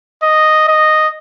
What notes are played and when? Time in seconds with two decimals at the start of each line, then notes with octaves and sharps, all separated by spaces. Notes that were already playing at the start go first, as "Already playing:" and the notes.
0.23 D#5
0.68 D#5